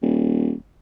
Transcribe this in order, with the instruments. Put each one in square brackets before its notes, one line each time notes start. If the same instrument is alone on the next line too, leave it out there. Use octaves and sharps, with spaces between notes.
[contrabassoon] D#1